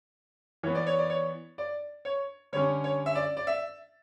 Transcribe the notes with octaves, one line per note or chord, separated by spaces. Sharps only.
E3 B3 C#5
D5
C#5
D5
C#5
D5
C#5
D3 G3 C#4 C#5
C#5
E5
D5
D5
E5